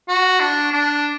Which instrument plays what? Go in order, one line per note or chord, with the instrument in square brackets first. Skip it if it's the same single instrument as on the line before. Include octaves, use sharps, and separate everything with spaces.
[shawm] F#4
D4
D4